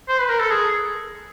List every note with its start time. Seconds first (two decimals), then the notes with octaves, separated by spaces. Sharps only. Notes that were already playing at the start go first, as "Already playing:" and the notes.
0.08 C5
0.19 B4
0.29 A#4
0.40 A4
0.50 G#4